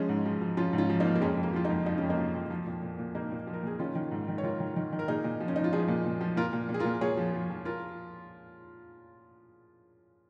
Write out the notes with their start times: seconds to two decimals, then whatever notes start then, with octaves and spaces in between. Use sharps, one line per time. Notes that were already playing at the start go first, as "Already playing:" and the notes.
Already playing: F3 G#3 C#4
0.09 G#2
0.25 F3
0.41 F3
0.57 F3 C#4 F4
0.73 G#2
0.78 C#4 F4
0.89 F3
1.00 A#3 D#4
1.06 F3
1.15 A#3
1.21 F2 G#3 C#4
1.37 F2
1.43 A#3
1.53 F3 F4
1.65 A#3 D#4
1.70 F2
1.86 F3 D#4
1.98 F2 C#4
2.09 A#3 D#4
2.18 F3
2.34 F2
2.50 F3
2.66 A#2
2.82 A#2
2.99 A#2
3.15 A#2 A#3 D#4
3.31 A#2
3.47 F3
3.53 A#4
3.63 A#2 G#4
3.79 D#3 C#4 F4
3.95 D#3
4.11 G#2
4.28 D#3
4.38 C#5
4.43 D#3 F4 A#4
4.60 D#3
4.76 D#3
4.92 D#3
4.99 A#4
5.08 A#2 D#4 G#4
5.24 A#2
5.40 F3
5.48 C#4
5.56 F3 D#4
5.64 F4
5.73 F3 D#4 G#4
5.88 A#2
6.05 A#2
6.21 F3
6.36 A#2 F4 A#4
6.53 A#2
6.69 A#2
6.74 G#4
6.80 F4 A#4
6.85 A#2
7.01 A#2 G#4 C#5
7.17 F3
7.33 F3
7.50 F3
7.65 F4 A#4